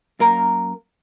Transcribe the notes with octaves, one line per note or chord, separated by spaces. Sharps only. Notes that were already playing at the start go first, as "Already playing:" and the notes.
F#2 A#3 A#4 A#5